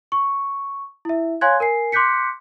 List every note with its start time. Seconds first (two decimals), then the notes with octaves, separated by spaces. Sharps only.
0.12 C#6
1.05 E4 E5
1.41 C#5 F5 G#5 C6 F#6 G#6
1.60 A#4 G#5 C7
1.92 C6 D6 F#6 G6 B6 C#7